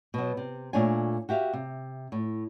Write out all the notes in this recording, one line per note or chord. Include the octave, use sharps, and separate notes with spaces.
B2 F#3
C3
A#2 A3 D4 C#5 G#5
F#4 G4 E5 F5
C3
A2